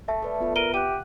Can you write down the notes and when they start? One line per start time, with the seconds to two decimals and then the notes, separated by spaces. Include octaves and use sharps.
0.08 A3 E5 A5
0.23 A4 B4 D5
0.40 B3 F4 B4
0.56 A#4 E5 D7 D#7 G7
0.74 G4 F#5 F#6 D#7